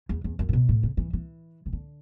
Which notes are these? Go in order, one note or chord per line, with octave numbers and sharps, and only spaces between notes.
E2
E2
F#2
A2
B2
A2
C#3
E3
E3
C#3
D3